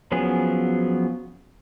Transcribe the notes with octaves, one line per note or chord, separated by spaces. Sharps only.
F3 F#3 B3 C#4 G#4